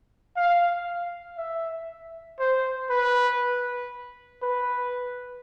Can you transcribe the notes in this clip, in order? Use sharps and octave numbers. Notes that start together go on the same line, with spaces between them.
F5
E5
C5
B4
B4